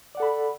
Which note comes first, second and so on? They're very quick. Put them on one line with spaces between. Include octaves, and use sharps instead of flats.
D5 F#5 A4 B5